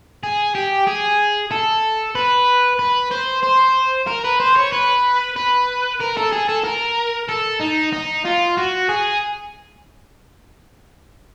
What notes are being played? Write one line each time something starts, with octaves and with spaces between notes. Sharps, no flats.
G#4
G4
G#4
A4
B4
B4
C5
C5
A#4
B4
C5
C#5
B4
B4
A#4
A4
G#4
A4
A#4
A4
D#4
D#4
F4
F#4
G#4